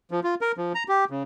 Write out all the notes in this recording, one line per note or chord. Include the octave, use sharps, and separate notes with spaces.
F3
F4
A#4
F3
A#5
G4
C#3